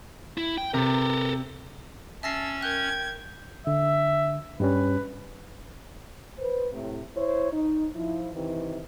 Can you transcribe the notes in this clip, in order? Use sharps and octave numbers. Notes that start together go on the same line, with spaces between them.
E4
G5
C3 A4 A#4
C#4 E5 A5 E6 A#6 C7
A#4 G5 F#6 G#6
D3 E5
G2 G3 C#4 B4
B4 C5
A2 C3
E4 C5 C#5
D#4
F3 E4
C3 D#3 E3